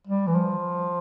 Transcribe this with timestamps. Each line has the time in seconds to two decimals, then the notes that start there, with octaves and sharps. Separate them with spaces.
0.07 G3
0.27 E3
0.35 F3